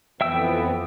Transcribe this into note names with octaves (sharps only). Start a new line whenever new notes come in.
F2 E3 B3 E5 G5 E6